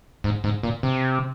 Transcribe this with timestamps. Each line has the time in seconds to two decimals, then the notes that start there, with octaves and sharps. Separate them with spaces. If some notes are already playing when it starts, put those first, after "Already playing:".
0.24 G#2
0.44 G#2
0.63 A#2
0.83 C3